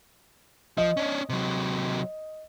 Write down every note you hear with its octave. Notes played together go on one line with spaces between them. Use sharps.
F3 D#5
C#4 D4
C3 F#3